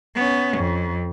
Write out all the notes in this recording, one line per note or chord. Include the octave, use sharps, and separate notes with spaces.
B3 C#4
F2